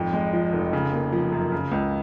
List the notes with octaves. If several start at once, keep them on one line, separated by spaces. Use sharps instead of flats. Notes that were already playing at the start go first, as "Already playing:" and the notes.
Already playing: G#1 F2
G#3
F3
F1
C#3
A#3
F3
F#2
C#3
C#2